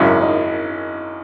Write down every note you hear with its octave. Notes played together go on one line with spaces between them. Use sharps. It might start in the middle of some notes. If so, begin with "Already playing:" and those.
Already playing: G#1 F#2 C#3 F#3 E4
D#4